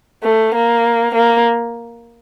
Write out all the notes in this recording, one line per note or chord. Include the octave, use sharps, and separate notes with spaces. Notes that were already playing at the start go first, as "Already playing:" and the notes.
A3
A#3
A#3